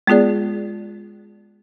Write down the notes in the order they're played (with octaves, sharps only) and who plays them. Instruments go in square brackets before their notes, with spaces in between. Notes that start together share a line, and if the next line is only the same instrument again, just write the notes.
[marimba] G#3 B3 F4 G#4 D5